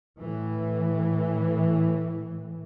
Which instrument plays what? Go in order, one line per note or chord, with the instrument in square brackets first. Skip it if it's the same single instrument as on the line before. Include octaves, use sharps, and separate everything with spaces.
[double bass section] A2 E3